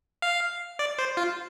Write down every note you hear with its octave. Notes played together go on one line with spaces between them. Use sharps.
F5
D5
C5
F4